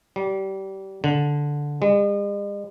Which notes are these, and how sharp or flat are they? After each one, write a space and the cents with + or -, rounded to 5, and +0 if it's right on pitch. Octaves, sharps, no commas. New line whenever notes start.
G3 -25
D3 -10
G#3 -45